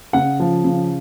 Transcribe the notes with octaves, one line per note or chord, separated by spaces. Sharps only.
C#3 F#5
F3
C#3